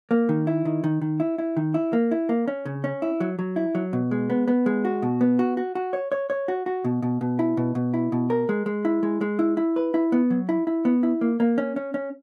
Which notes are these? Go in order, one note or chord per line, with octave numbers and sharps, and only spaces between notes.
A#3
D#3
E4
D#3
D#3
D#3
E4
E4
D#3
E4
A#3
E4
A#3
C#4
C#3
C#4
E4
F#3
F#3
E4
F#3
B2
G#3
B3
B3
G#3
F#4
B2
B3
F#4
F#4
F#4
C#5
C#5
C#5
F#4
F#4
B2
B2
B2
E4
B2
B2
E4
B2
A#4
G#3
G#3
E4
G#3
G#3
E4
E4
B4
E4
B3
F#3
E4
E4
B3
E4
A#3
A#3
C#4
C#4
C#4